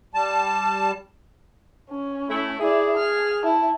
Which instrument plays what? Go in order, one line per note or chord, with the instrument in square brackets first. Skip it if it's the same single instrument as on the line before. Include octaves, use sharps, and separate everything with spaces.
[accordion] G3 A5
[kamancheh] C#4
[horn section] A3 E4
[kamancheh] E4 D5 [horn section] G#4
[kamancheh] F6
E4 A5